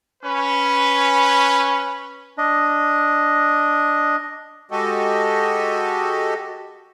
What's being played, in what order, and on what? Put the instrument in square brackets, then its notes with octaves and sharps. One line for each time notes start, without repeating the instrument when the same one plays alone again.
[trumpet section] C#4 B4
[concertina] D4 D#5
[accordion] G#3 F#4 G4 A4 D#5